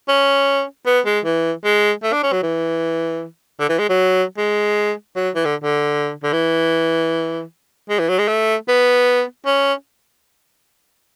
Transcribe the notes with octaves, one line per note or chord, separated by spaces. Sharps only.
C#4
B3
G#3
E3
G#3
A3
D4
C#4
F#3
E3
D3
E3
G#3
F#3
G#3
F#3
E3
D3
D3
D3
E3
G#3
E3
F#3
G#3
A3
B3
C#4